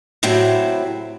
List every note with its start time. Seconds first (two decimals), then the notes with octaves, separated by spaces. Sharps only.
0.23 A2 C3 F#3 C4 E4